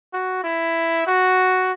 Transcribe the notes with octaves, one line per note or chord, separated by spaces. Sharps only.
F#4
E4
F#4